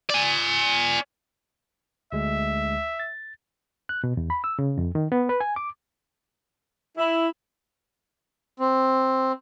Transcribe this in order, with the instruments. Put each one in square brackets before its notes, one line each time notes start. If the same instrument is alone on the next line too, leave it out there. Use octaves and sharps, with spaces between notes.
[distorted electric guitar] D5 G#5
[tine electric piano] D2 G#3 [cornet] E5
[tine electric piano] A6
[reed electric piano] F#6
B2
E2
B5
E6
C#3
F2
D#3
B3
B4
G#5
D6
[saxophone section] E4
[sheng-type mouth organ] C4